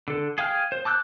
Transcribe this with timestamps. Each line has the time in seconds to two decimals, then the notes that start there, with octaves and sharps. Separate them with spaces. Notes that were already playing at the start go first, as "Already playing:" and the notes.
0.08 D3 A4
0.38 G#4 F5 G5 F6
0.72 C5
0.85 A5 D6 E6 F#6 G6